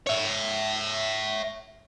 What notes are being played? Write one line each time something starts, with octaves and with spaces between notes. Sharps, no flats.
C#5 E5